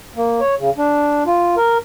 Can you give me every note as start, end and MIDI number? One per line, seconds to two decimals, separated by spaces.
0.16 0.40 58
0.40 0.55 73
0.58 0.70 49
0.78 1.24 62
1.26 1.56 65
1.57 1.78 70